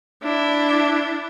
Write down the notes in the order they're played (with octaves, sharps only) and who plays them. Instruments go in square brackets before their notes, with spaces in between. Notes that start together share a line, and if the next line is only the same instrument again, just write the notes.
[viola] D4 E4